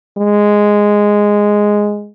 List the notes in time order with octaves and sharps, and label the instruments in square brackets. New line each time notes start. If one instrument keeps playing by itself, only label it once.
[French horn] G#3